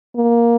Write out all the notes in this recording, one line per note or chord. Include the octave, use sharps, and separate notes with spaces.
A#3